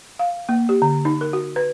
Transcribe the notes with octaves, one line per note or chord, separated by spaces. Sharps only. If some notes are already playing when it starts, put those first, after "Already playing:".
F5
A#3
G4
D3
D#4
A#4
F#4
B4